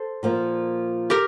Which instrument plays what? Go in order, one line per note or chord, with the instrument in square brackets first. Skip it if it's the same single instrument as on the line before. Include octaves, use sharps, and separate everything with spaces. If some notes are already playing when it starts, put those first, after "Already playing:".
Already playing: [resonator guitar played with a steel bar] A4 C5
[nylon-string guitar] A#2 F3 A#3
[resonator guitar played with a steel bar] G4 A#4